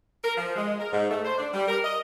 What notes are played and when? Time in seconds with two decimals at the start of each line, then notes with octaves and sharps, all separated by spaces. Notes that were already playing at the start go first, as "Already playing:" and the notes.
0.24 A#4
0.37 F3
0.56 G#3
0.80 A#4
0.92 G#2
1.11 A3
1.25 C5
1.38 D4
1.53 G3
1.68 A#4
1.84 D#5